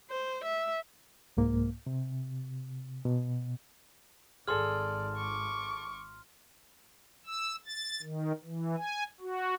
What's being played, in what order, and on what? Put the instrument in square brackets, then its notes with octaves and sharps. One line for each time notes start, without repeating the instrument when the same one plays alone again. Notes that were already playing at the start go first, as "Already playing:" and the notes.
[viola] C5
E5
[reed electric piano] C2 G#2 A#3
C3
B2
[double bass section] G#1 [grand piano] G#4 A4 [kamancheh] D5 [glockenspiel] C6 F6
[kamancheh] C#6 D6
[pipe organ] E6
A6
D#3
E3
G#5
F#4